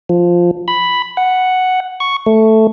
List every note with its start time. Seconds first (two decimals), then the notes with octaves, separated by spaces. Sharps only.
0.09 F3
0.68 B5
1.17 F#5
2.00 C#6
2.26 A3